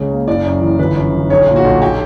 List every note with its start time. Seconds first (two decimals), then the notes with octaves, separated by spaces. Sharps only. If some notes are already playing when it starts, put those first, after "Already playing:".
Already playing: C#2 C#3
0.10 A#3
0.28 F#1 D5
0.44 F#2
0.61 E3
0.79 G1 B4
0.96 F#2
1.13 G1
1.30 B1 C#5
1.47 A#2
1.56 F#4
1.64 B1
1.82 G4